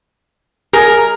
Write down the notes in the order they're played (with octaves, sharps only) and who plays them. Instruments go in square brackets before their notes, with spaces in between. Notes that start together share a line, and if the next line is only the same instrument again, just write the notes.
[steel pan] G#4 [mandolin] A#4